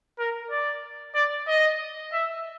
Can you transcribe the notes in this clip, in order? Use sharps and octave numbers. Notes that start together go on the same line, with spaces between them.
A#4
D5
D5
D#5
E5